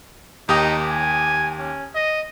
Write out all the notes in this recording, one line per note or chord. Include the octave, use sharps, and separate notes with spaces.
D#2 D#4 G4 D#6
G#5
C#4
D#5